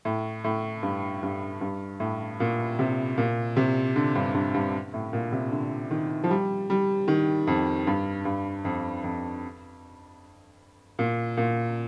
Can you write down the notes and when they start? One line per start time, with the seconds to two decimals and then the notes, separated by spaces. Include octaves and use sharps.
0.05 A2
0.44 A2
0.83 G2
1.23 G2
1.61 G2
2.00 A2
2.40 A#2
2.79 C3
3.18 A#2
3.56 C3
3.96 D3
4.15 G2
4.34 G2
4.54 G2
4.93 A2
5.13 A#2
5.32 C3
5.52 D3
5.91 D#3
6.24 F3
6.30 G3
6.70 G3
7.08 D#3
7.47 F2
7.87 G2
8.25 G2
8.65 F2
9.04 F2
10.99 A#2
11.37 A#2